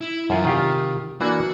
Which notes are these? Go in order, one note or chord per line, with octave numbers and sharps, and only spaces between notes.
E4
F#2 E3 F3 F4 G#5
C3 D#3 F4 G4
E3 A#3 D4 F#4